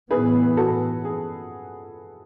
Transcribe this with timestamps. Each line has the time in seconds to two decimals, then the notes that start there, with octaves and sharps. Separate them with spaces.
0.11 A2 E3 B3 G#4 B4
0.57 F#4 A4
1.04 G#4